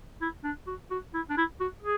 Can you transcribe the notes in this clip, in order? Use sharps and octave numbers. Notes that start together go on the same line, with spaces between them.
E4
D4
F#4
F#4
E4
D4
E4
F#4
G#4